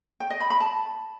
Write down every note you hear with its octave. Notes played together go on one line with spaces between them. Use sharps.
G5
D#5
B5
B5
A5